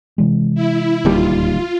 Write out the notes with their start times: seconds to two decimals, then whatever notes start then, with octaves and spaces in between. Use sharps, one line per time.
0.18 C3 E3 G#3
0.55 E4
1.05 D1 D#2 G3 F4